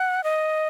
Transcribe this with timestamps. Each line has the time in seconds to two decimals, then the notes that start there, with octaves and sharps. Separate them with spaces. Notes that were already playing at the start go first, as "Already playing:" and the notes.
Already playing: F#5
0.24 D#5